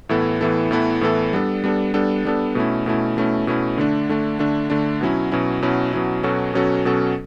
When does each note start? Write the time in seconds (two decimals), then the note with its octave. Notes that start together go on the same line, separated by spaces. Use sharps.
0.09 A2 E3 B3 E4 A4
0.41 A2 E3 B3 E4 A4
0.71 A2 E3 B3 E4 A4
1.01 A2 E3 B3 E4 A4
1.33 G3 B3 D4 A4
1.64 G3 B3 D4 A4
1.94 G3 B3 D4 A4
2.25 G3 B3 D4 A4
2.55 B2 A3 C#4 E4
2.86 B2 A3 C#4 E4
3.17 B2 A3 C#4 E4
3.47 B2 A3 C#4 E4
3.78 D3 A3 D4
4.09 D3 A3 D4
4.39 D3 A3 D4
4.70 D3 A3 D4
5.01 B2 F#3 C#4 E4
5.32 B2 F#3 C#4 E4
5.62 B2 F#3 C#4 E4
5.93 B2 F#3 C#4 E4
6.23 B2 F#3 C#4 F#4 A4
6.54 B2 F#3 C#4 F#4 A4
6.85 B2 F#3 C#4 F#4 A4